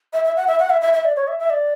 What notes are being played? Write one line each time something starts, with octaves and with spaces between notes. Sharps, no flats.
E5
E5
F#5
E5
F#5
E5
E5
E5
D5
C#5
E5
E5
D5